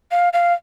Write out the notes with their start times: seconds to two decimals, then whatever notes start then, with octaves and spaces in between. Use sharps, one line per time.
0.11 F5
0.33 F5